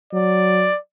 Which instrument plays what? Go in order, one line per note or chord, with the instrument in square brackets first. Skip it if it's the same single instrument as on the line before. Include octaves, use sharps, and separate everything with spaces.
[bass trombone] F#3 [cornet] D5